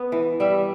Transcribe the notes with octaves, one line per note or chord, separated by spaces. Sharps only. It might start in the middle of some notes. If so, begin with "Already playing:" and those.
Already playing: B3
E3
G3 E5